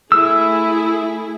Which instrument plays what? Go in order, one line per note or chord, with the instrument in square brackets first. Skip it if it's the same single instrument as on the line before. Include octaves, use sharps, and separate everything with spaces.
[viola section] A3 E4 G#4 [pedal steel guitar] E6